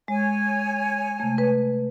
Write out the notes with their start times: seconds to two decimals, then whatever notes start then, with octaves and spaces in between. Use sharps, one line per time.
0.08 G#3 C#5 G#5
1.20 C3 A3
1.38 B4